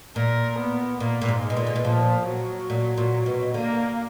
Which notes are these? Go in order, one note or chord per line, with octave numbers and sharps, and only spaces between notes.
A#2 A#4
B3
A#2 A#3
A#2
G#2
G#3
B2
A#2
D3
B2
A#2 F3
F#3
A#2
A#2
B2
D3 A#3